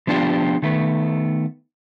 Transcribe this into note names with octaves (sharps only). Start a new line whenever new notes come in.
F3 B3 D4 F4 G4
D#3 A3 B3